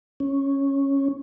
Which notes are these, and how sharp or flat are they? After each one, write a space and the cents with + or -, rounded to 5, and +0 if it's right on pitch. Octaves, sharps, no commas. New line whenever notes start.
C#4 -10